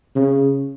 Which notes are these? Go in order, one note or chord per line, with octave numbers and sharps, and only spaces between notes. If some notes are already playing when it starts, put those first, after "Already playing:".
C#3